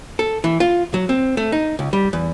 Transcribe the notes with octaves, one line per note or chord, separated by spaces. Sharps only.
A4
E3
F4
F#3
C4
A3
D#4
C#2
G3
E2